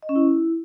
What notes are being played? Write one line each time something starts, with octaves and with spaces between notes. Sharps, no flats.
D#5
C#4
E4